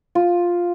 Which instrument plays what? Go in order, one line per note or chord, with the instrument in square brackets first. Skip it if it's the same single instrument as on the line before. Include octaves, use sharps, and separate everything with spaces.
[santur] F4